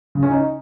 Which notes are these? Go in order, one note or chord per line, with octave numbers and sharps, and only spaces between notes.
C#3
C#4
D#4